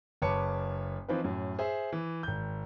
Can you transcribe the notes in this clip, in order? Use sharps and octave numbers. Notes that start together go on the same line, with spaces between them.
F#1 B4 C#5 A5 D6 C#7
E3 F3 C4 D#4 F4 B4
F#2 A2
G#4 C5 E5
E3
G#1 G6